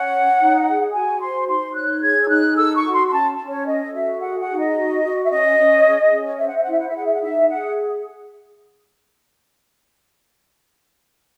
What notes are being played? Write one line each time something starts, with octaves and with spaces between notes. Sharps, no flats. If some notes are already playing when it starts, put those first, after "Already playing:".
Already playing: C#4 F#5
C#5
D#4
G#4
F#4 G#5
C5 C6
D#4 C6
C#5 F#6
G#4 G#6
E6
D#4 F#6
A4 E6
C#6
F#4
C6
C6
C#4 A5
C#4
C#5
A4 D#5
F#4 E5
G#4 F#5
F#5
D#4
D#5
F#4
F#4
E5
C#4 D#5
C#4
G#4
C#4
C5 E5
F#5
E5
E4 F#5
E5
F#5
E5
G#4 F#5
E5
F#5
D#4 E5
G#4 F#5